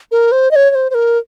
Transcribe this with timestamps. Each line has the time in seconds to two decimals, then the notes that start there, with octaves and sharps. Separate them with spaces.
0.12 A#4
0.32 C5
0.51 D#5
0.56 C#5
0.70 C#5
0.75 C5
0.90 C5
0.95 A#4